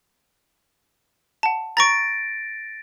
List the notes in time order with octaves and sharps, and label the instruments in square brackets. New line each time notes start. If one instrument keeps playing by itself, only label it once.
[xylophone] F#5 A5
[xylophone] A#5 C#6 [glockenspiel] A6 A#6 D7